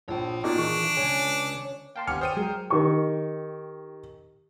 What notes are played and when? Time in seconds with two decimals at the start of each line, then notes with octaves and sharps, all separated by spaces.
0.08 A#1 C#5 G5
0.44 A#2 D4 D#4 F#4 C#6
0.58 E3 F3 G#4 C#6
0.97 C#2 C#3 C#5 G#5
1.96 A#3 F5 G5 A5 C6
2.07 G1 D#2 B3 C#4 G4 G#5 F6 C#7
2.21 G#4 C5 D5 G5 D#7
2.37 F#3 G#3 G#4 A#4
2.70 D#3 G4 C#6